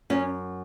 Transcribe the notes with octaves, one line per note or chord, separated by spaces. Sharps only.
F#2 C#4